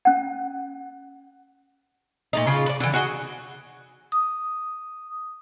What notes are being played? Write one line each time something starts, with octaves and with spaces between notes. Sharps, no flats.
C#4 F#5
A#2 A3 D#4
C#3 F4
B4 D5
D3 E3
F#4 G#4 D#5
D#6